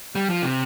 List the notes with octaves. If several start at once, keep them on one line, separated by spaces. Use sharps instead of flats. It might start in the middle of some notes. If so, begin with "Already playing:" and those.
G3
F3
C3